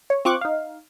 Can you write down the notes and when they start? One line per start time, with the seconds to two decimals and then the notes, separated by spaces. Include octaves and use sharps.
0.10 C#5
0.25 C4 F4 C#6 D6 F#6
0.41 D#4 F5